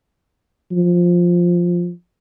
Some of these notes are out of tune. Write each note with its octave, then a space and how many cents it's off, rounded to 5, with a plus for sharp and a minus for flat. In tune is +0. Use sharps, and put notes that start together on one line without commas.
F3 +5